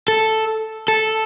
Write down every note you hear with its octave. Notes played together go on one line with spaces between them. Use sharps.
A4
A4